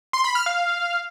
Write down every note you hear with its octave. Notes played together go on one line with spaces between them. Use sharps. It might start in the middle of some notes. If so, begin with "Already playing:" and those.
C6
B5
F6
F5